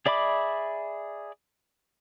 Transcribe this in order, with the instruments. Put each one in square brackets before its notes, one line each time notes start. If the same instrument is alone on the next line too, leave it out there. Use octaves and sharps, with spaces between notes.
[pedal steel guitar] G#4 D5 E5 B5 D6